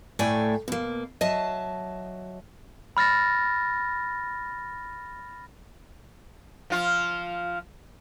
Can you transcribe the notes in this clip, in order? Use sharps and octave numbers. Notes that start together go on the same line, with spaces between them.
A2 A3 D5 G5 G#5
B2 A#3
F#3 D#5 E5 A5
B5 F6 A6 A#6
F3 F4